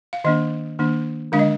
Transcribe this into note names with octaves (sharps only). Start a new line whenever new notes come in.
F5
D#3 A#3 D4 D#5
D#3 A#3 D4
D3 G#3 D4 F5
D#5